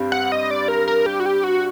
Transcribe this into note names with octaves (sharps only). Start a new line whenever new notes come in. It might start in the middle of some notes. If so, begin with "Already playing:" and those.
Already playing: G2 G3 C4
F#5
D#5
D5
A#4
A#4
G4
F#4
G4
F#4